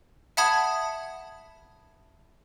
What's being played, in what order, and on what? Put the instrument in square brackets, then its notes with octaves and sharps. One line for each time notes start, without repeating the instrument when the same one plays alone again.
[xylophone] E5 F#5 A5 B5 D#6 G#6